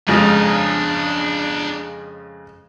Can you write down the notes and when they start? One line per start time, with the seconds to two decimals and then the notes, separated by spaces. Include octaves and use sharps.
0.08 F2 C#3 G#3 D4 A#5